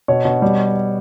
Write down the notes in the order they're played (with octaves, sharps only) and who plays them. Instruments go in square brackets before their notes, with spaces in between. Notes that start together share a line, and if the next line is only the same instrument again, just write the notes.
[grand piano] B2 C#5
B2
G3